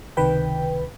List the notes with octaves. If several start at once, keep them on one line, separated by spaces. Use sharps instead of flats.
C#2 C3 D#3 B4 G5